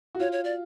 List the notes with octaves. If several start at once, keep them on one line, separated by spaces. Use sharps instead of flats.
F#4
F4 C#5
C#5
D5